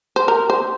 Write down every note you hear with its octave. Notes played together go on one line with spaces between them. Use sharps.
C5
A#4
C5